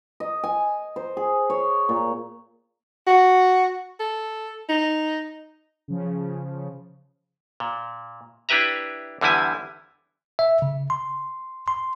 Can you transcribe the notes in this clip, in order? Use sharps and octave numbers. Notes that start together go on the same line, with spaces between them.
D#5
G#5
C5
G#4
C#5
A#2
F#4
A4
D#4
C#3 F3
A#2
D4 E4 G4 B4 E5 A#5
E2 D3 G3 E4 G#5
E5
C#3
C6
C6